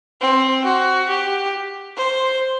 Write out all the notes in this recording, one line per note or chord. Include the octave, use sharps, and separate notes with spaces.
C4
F#4
G4
C5